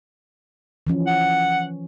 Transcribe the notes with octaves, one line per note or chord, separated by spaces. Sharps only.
E3 F3 C#4
F#5